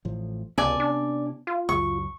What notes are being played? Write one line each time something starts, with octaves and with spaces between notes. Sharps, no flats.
A1 A2 F3
C#2 C3 B3 C#4 D5 G#5 A5
D4
F4
C#2 F#2 C#6